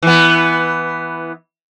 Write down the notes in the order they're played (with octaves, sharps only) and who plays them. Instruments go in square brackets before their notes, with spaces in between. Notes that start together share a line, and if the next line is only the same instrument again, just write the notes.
[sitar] E3 B3